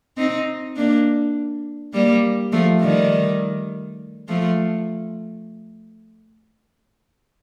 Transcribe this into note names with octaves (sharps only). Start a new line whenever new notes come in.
C4 D#4
A#3 D4
G3 A#3
F3 A3
D#3 G3
F3 A3